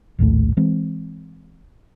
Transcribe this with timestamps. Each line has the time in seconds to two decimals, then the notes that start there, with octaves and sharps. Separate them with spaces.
0.19 A#1 D#2 A2 A3
0.57 E3 G#3 C4